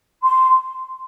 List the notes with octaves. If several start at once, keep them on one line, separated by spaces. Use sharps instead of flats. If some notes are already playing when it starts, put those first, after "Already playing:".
C6